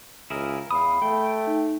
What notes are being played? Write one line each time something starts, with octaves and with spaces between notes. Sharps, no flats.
C#2 E4 G#4 A#4
E2 F5 B5 D#6
A3 G5
D#4